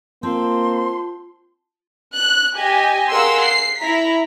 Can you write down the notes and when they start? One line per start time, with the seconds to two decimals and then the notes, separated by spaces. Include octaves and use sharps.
0.23 A#3 C4 F4 A5 C6
2.16 F#6
2.57 G4 D#5 G#5
3.10 G#4 A#4 F5 F#5 C6 E6
3.42 C7
3.80 E4 A#5 B6